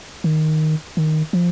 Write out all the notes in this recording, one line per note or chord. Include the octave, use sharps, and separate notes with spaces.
D#3
D#3
F3